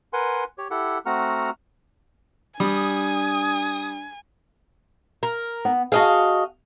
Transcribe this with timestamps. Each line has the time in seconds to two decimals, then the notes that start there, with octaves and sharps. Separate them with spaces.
0.13 A#4 B4 F#5 G#5 C6
0.58 G4 C#5
0.71 E4 G4 A4 F#5
1.06 A3 C4 F#4 F#5 A#5 F6
2.60 G3 D4 G#5 D#6
5.23 A#4
5.65 B3
5.92 F#4 G#4 D#5 F5 A5